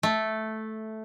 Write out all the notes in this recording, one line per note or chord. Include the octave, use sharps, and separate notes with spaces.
A3